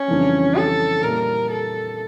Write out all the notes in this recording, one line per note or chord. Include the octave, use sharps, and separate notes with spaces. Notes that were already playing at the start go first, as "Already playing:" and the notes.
Already playing: C#4
F2 C#3 E3 G3 D4
A4
A#2 G3 A#3 E4 A#4
A4